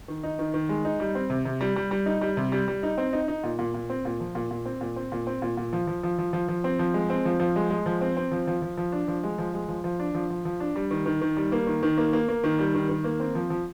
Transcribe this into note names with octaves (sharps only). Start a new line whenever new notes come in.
D#3
D#4
D#3
D#3
G#3
D#4
G3
C4
C3
C3
G3
G3
G3
D#4
G3
C3
G3
G3
D#4
C4
D#4
D#4
A#2
A#2
A#2
C4
A#2
F3
A#2
A#2
C4
A#2
C4
A#2
C4
A#2
A#2
F3
F3
F3
F3
F3
F3
C4
F3
G#3
C4
F3
F3
G#3
G#3
F3
C4
C4
F3
F3
F3
F3
D4
F3
G#3
F3
G#3
F3
F3
D4
F3
F3
F3
D4
G3
D#3
D#3
D#3
G3
A#3
D#3
D#3
A#3
A#3
A#3
D#3
G3
D#3
D#3
A#3
C4
F3
F3